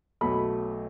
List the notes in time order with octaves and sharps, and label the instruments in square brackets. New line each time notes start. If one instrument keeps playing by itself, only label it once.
[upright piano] B1 B2 F#3 A3 B5